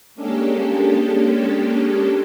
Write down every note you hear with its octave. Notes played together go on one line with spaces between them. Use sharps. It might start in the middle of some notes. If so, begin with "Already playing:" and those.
G#3 A#3 C#4 D4 G4 A4